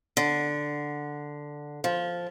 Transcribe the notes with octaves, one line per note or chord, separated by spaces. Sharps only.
D3
F3